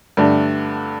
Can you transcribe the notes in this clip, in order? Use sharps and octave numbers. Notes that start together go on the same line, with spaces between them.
G2 D3 A3 D4 G4